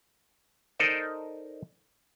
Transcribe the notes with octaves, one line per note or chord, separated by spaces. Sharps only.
D#4 A4 A#4 C5 D5 D#5